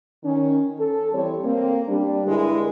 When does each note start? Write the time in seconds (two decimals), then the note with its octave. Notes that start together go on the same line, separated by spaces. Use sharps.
0.24 D#3 C#4
0.79 A4
1.13 E3 G3 C4 G4 C#5
1.43 A#3 C4
1.88 G3 D4
2.27 G2 D3 G#3 E4 A#4